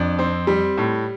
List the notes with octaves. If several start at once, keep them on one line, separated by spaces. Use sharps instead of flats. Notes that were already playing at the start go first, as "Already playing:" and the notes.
Already playing: F2 D4
C4
G3
A2